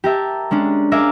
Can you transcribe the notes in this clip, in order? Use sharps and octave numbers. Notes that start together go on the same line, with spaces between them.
G4 A#4 E5 A5
G#3 C#4 D4
G#4 A#4 E5 F5 D6